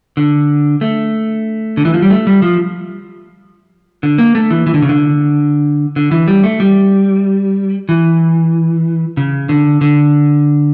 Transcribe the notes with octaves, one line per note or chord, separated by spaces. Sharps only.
D3
A3
D3
E3
F3
G3
A3
G3
F3
D3
A#3
A3
E3
E3
D3
C#3
D3
D3
E3
G3
A3
G3
E3
C#3
D3
D3